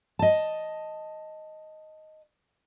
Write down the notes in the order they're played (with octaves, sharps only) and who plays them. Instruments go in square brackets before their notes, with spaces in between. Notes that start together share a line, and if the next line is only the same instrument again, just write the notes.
[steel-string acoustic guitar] D#5 A5